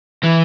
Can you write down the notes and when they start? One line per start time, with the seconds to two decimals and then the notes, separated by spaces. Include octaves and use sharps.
0.23 E3